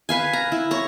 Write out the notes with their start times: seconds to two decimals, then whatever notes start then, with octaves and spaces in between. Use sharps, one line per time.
0.09 B4 F5 G#5
0.33 A#5
0.52 E4
0.71 C#5 A#5